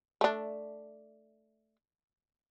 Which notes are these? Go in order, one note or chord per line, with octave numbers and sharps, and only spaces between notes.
A3 D4